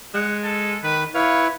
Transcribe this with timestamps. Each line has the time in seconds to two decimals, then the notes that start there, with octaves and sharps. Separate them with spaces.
0.14 G#3 F#5
0.44 A4
0.83 D#3 B4
1.15 E4 B4 C#5 F5